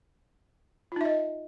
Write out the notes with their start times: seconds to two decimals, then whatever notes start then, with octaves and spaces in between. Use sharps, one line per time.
0.92 F4
0.96 D#4
1.01 E5
1.05 D#5